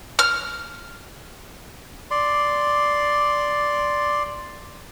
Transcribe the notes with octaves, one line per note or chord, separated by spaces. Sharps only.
F6
D5 C6